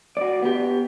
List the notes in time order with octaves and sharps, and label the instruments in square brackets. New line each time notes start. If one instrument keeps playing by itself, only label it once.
[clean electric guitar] F#4 D5
B3 G4